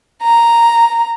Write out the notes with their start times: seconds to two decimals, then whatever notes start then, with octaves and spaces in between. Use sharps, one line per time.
0.21 A#5